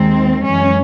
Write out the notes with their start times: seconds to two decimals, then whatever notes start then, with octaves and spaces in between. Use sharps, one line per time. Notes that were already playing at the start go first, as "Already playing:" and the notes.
Already playing: D#2 D#3 G#3 C4
0.45 F#2 E3 G#3 C#4